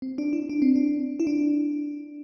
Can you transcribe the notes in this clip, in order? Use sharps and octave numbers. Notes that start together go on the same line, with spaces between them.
C4
D4
E4
D4
C4
D4
E4
D4